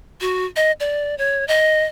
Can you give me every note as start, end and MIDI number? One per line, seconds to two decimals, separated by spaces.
0.21 0.45 66
0.56 0.72 75
0.80 1.17 74
1.18 1.46 73
1.48 1.85 75